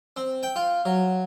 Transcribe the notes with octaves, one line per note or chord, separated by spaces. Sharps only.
C4
G5
F4
F#3